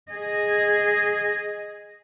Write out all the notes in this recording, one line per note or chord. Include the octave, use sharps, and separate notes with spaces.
G#4 D#5